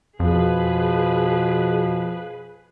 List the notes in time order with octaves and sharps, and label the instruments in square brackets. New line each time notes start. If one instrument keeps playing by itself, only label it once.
[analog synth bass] F2 [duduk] B2 [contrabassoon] F3 [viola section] G#4 B4